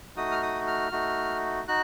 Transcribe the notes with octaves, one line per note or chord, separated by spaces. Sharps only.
A3 D#4 F#4 D#6
F6
D#6
F6
A3 D#4 F#4
D#4 F#4 F#6